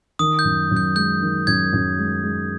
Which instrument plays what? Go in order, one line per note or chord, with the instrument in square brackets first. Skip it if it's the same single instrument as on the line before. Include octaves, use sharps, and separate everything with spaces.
[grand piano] D#3 [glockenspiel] D#6
[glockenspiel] G6
[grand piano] F#2
F#2
[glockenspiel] G6
[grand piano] G#3 [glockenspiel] G6
[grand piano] D#3
[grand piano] F#2 [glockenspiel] G#6
[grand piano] F#2
G#3
G#3